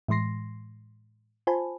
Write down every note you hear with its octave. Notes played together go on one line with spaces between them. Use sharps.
A2 E3 G#3 C6 A#6 C7
F4 C5 G#5 A5 B5